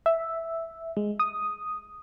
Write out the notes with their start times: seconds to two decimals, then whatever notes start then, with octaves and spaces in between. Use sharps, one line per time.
0.06 E5
0.97 G#3
1.19 D#6